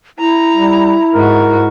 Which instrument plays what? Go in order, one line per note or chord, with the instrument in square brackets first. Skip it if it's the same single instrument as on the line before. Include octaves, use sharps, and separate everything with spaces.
[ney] E4 [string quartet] A#5
[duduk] G3
[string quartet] G#2 F#4 [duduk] A#4